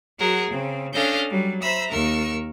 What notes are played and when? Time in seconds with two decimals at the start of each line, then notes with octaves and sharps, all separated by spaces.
0.19 F#3 F#4 G#4 A#4 F#5
0.50 C#3 C4
0.94 C#4 D4 A4 D#5 F5 G6
1.30 F#3 G3
1.61 C5 E5 A#5 B5 E6
1.90 D#2 A#4 C#6 E6